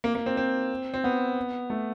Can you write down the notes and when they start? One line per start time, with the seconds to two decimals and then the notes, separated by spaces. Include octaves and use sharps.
0.04 A#3
0.15 A#3
0.26 C4
0.37 C4
0.94 C4
1.04 B3
1.70 A3